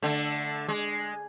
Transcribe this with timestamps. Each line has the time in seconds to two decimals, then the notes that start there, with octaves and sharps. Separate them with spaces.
0.02 D3 A3
0.68 G#3